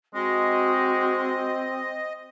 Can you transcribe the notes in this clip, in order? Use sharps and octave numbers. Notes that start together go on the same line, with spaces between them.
G#3 C4 F#4 D#5